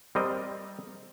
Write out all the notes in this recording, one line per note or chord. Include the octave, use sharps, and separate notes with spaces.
G3 C4 A#4 D#5